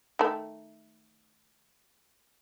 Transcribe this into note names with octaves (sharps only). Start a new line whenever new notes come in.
D#3 A3